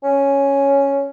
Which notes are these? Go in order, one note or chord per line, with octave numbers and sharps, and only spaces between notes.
C#4